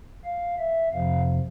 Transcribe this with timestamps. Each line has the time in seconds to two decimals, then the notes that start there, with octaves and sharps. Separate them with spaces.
0.25 F5
0.59 E5
0.92 F2 C3 F3 F5